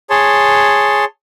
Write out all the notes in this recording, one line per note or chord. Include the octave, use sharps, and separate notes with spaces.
G#4 C#5 A5 C6